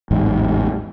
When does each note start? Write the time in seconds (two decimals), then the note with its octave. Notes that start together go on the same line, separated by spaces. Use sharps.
0.11 A1 E2 G#2